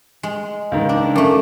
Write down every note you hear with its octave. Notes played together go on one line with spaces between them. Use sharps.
G#3
C#2 G#2 D#3
D4
F#2 A3 D6